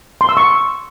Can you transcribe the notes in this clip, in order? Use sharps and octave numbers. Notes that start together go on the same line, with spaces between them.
C6
E6
C#6